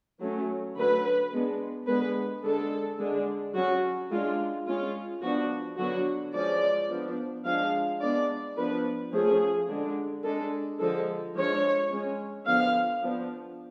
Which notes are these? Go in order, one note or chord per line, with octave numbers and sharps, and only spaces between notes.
F#3 A3 C#4
D3 F#3 A3 B4
G#3 B3 D4
D3 G#3 B3 B4
D3 G#3 D4 A4
D3 G#3 D4
F#3 C#4 F#4
G#3 D4 F4
G#3 C#4 F4
F3 B3 D4 F#4
D3 F#3 B3 D4 F#4
F3 G#3 C#4 D5
F3 B3 D4
F3 G#3 D4 F5
G#3 B3 D4 D5
F3 B3 D4 B4
F3 A3 C#4 G#4
D3 G#3 D4
G#3 D4 A4
D3 F3 G#3 A4
F3 G#3 D4 C#5
G#3 C#4
D3 F3 B3 F5
F3 B3 D4